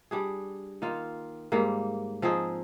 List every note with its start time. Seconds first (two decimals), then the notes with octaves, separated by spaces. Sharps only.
0.11 G3 D4 G#4
0.82 D#3 A#3 F4
1.52 G#2 G3 A#3
2.22 F3 C4 D#4 G#4